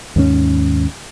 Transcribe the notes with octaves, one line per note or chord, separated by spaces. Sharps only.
D#2 G#2 B3 C#4